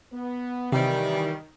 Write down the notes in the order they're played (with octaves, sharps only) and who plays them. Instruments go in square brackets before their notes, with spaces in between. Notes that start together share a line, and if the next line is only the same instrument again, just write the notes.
[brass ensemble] B3
[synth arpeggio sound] C3 [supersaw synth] D#3 [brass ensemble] E3 [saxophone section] G3